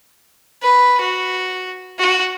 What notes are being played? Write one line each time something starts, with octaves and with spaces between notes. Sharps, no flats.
B4
F#4
F#4